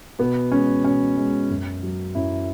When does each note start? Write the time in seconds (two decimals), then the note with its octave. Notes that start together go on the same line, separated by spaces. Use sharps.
0.19 B2 B3
0.51 G#3 C#4
0.84 B2 C#4
1.17 G#3
1.50 F#2
1.83 F#3
2.15 F#2 E4